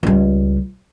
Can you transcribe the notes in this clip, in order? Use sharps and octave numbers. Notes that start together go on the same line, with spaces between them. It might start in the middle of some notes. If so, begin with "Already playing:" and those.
C#2 G3